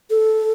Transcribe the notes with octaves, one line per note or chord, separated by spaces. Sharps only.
A4